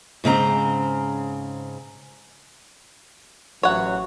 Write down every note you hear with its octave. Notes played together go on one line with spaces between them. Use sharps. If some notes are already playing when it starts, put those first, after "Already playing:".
G#2 C#3 C4 A#5
A1 E3 F#3 C#5 F#5